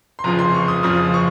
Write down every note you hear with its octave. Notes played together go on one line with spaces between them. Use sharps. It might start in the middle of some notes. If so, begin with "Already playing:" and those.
C6
F1 F2 C#3 F3 A#5
C6
C#6
D#6
F1 F2 C#3 F3 D#6
C#6